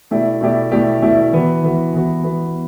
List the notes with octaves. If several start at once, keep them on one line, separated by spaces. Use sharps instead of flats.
B2 A3 E4 G4 D5
B2 A3 E4 G4 D5
B2 A3 E4 G4 D5
B2 A3 E4 G4 D5
E3 B3 F#4
E3 B3 F#4
E3 B3 F#4
E3 B3 F#4